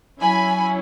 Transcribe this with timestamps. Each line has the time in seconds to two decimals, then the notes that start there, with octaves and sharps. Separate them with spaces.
0.19 F#3 C#4 E4 G#5 B5